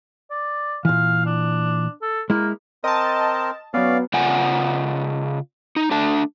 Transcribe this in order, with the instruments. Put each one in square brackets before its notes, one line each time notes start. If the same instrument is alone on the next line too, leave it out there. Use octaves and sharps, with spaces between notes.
[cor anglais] D5
[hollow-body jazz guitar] A#2 E3 [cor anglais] F5
[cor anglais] D4
A4
[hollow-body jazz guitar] G#3 E4 [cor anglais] A#3
[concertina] C4 A#4 [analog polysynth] D#5 A5
[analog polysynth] F#3 B3 [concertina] C#4 D5 F5
[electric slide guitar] C#3 F4 D5 F#5 G#5
D#4
A3 D4 A5